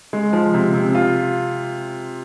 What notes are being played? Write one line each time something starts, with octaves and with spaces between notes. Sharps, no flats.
G#3
F3
C3
C3
F4